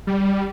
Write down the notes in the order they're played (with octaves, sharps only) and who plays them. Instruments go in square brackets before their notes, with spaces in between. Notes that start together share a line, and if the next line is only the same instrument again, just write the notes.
[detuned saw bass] G3